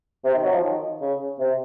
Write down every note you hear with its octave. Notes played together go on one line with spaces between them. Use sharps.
C3
D#3
F#3
F3
D#3
C#3
C3